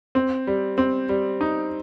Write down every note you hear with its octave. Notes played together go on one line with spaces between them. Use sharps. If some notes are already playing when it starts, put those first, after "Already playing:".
C4
G3
C4
G3
D#4